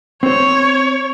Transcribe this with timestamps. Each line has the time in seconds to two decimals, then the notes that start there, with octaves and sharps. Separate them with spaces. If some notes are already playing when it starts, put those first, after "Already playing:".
0.23 C4 C5 C#5